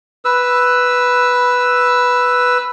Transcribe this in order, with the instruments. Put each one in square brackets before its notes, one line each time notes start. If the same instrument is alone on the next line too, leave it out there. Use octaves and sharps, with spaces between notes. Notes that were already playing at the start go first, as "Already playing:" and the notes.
[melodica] B4 E6